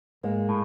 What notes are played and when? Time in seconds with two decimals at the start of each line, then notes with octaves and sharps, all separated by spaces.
0.23 G#2 G#3 A#3
0.49 A2